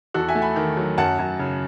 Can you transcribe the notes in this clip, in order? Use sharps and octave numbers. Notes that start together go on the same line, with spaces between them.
E2 F#4 A4
E5 G#5
A3
G#5 B5
D#3
F#3
F#2 F#5 A5
F#2
C#3